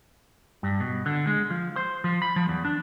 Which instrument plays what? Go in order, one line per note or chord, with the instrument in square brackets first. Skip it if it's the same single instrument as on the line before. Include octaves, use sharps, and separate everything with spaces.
[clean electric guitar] G2
B2
D3
G#3
F3
C5
F3
B5
F3
E2
D4